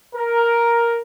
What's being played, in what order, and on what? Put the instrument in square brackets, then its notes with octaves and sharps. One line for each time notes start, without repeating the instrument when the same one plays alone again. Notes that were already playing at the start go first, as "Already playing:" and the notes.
[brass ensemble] A#4